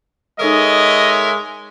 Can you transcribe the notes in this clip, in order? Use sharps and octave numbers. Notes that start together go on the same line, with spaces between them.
G#3 D#4 A4 A#4 C#5 D#5 E5 D#6